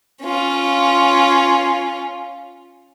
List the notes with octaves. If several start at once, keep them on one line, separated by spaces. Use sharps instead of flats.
C#4 F4